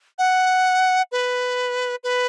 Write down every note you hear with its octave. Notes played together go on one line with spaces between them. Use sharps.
F#5
B4
B4